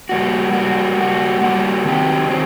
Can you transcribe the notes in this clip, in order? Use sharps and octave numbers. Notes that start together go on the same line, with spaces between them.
G3 A#3 F#4
G3 A#3 F#4
G3 A#3 F#4
G3 A#3 F#4
D#3 F#3 C4 D#4 G4
D#3 F#3 C4